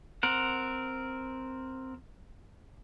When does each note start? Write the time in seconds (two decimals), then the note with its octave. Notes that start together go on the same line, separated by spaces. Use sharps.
0.23 C4 A#4 F#5